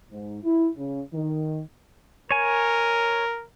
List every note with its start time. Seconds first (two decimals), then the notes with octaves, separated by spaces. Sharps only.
0.10 G#2
0.43 E4
0.76 C#3
1.13 D#3
2.31 A#4 C#5 G#5